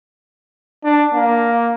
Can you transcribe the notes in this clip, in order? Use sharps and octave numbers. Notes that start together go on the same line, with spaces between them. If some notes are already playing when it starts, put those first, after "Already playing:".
D4
A#3